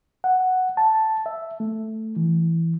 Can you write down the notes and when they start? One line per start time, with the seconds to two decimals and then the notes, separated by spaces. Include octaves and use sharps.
0.24 F#5
0.77 A5
1.26 E5
1.60 A3
2.16 E3